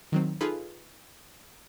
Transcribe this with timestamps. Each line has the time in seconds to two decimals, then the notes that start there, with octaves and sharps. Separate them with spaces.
0.12 D#3 F#3 C4
0.41 D#4 F4 G#4 A4 B4